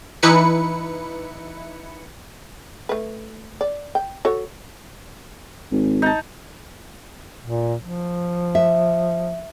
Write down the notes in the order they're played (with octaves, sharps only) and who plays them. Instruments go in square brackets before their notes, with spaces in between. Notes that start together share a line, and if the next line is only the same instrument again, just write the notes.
[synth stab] E3 D#4 E4 B4 C#7
[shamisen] A3 B4
D5
G5
F#4 A4 C#5
[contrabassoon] G#1
[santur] D#4 A5
[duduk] A#2
F3
[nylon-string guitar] E5